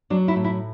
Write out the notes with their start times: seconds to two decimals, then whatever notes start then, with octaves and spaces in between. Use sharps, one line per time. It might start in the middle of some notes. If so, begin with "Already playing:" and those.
0.10 F#3 D4
0.28 E4
0.36 A2
0.44 E4